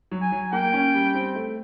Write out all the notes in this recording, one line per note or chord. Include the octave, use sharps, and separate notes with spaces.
F#3
G#5
F#3
A#3 G5
C#4
G3
C4
A3